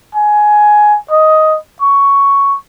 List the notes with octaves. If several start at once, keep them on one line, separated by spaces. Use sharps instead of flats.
G#5
D#5
C#6